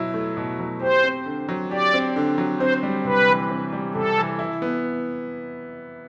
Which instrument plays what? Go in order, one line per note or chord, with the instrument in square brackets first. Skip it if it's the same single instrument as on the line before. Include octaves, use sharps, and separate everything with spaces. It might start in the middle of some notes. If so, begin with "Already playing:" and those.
Already playing: [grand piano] B2 F#3 E4
A3
B2
F#3
[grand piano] G4 [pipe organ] C5
[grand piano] C4
D3
F#3
[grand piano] G4 [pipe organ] D5
[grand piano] C4
D3
F#3
[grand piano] C4 [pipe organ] C5
[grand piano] G3
[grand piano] C3 [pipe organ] B4
[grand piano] E3
C4
G3
[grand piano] C3 [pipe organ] A4
[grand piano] E3
E4
B3